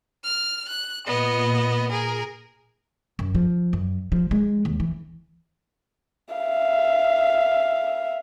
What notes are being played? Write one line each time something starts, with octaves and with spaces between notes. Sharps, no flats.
F6
F#6
A#2 B3 D#5
G#4 A#4
F#2
F3
F#2
F3
G#3
D#2
E3
E5 F5